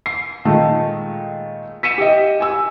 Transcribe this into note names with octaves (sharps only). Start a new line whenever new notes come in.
C7
A#2 D#3 G#3 A3
B6 C#7 D#7 E7
G4 D#5
G#5 E6